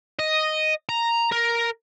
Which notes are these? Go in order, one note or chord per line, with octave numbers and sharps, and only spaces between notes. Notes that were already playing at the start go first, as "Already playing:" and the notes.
D#5
A#5
A#4